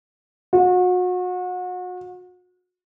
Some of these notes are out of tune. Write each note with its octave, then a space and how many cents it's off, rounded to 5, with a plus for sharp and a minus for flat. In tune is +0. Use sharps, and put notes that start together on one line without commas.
F#4 -35